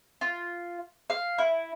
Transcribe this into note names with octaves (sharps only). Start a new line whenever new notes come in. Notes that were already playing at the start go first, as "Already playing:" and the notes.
F4
F5
E4